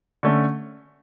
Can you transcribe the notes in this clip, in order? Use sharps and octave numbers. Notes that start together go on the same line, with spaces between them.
D3 A3 C#4